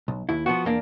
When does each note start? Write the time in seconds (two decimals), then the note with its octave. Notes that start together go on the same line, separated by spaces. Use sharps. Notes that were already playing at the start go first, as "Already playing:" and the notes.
0.08 B1
0.29 D#2 E4
0.46 F3 B3 F#4
0.65 E2 A#3 D4